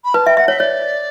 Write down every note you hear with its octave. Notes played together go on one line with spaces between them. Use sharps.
B5
B4 A5
E5 G5
E5 F#5
C#5 E5
C#5 D5